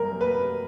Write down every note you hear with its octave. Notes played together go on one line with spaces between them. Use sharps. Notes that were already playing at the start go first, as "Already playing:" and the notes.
Already playing: F#2 G3 A#4
B4